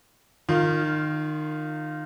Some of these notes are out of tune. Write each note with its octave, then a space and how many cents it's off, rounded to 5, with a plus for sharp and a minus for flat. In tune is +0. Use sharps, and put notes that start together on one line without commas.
D#3 -25 F4 +0